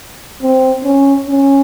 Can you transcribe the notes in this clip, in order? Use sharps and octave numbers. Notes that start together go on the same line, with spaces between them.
C4
C#4
C#4